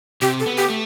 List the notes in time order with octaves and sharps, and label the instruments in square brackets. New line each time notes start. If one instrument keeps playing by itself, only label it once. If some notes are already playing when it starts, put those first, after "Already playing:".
[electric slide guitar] C3 [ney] G4
[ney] A4
[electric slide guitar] B3
[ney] G4
[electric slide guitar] A3